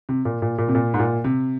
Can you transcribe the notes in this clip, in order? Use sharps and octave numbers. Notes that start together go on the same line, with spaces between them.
C3
A#2
A#2
A#2
C3
A#2
G#2
A#2
C3